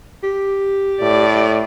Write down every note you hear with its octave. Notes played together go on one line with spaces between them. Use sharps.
G4
A2 D5